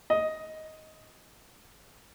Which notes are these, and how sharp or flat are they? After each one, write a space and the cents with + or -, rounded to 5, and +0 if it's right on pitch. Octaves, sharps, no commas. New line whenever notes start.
D#5 +10